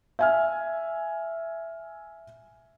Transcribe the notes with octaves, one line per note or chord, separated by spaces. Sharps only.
E5 G#5 F6